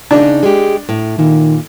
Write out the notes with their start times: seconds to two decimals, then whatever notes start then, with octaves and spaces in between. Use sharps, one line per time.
0.11 C#3 D4 D#4
0.43 G#3 G4
0.89 A2
1.19 A#2 D#3